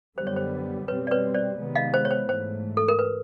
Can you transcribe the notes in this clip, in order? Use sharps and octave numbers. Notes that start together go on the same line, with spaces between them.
F#2 D3 G3 B3 C5
C#5
C5
B2 G3 C4 B4 C#5
D5
B4 C#5
C5 D5
C3 D#3 G#3 B3
D#5 F5
C5
C#5
C5
G#2 E3 A3 C5
A4
A#4
B4